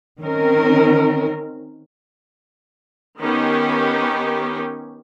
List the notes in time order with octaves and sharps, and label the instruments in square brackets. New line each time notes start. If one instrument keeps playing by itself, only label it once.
[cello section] D#3 C4 C#4 A#4
[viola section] D#3 B3 C#4 D#4 G4